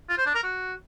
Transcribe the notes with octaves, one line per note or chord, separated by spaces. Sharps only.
F4
C5
D4
A#4
F#4